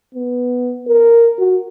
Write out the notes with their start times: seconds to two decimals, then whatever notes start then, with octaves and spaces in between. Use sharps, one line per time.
0.15 B3
0.88 A#4
1.39 F#4